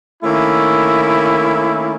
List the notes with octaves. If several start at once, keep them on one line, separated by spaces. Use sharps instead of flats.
D#3 A3 A#3 C#4 E4